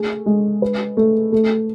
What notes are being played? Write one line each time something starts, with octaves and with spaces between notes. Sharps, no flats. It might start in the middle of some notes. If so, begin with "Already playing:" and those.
Already playing: A3 G#4
G#3
B4
A3
A3